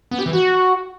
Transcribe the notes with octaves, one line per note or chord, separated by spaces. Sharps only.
B3
G4
E3
F#4